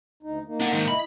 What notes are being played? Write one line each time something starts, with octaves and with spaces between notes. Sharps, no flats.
D2 D#4
A#3 D#4
D4 F#5
G#2 D#3
E4 D#5 B5